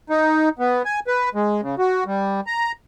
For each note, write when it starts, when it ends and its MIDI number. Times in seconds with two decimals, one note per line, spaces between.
0.10 0.49 63
0.59 0.82 59
0.85 1.00 80
1.07 1.29 71
1.35 1.61 56
1.62 1.75 49
1.78 2.04 66
2.06 2.41 55
2.47 2.72 82